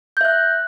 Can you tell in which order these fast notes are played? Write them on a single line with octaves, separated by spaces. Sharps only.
G6 E5 F#6